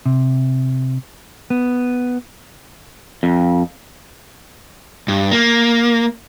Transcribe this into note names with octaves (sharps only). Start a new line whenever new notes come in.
C3
B3
F2
G2
A#3